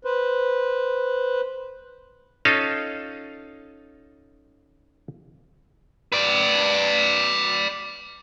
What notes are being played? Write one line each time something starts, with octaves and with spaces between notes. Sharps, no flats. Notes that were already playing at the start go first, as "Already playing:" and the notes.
B4 C5
C#4 D#4 F4 A4 F5
B4 D5